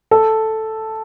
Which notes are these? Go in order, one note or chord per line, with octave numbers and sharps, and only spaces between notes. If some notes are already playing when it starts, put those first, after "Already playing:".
A4